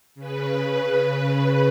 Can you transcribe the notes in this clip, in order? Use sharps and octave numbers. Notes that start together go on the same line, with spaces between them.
C#3 B4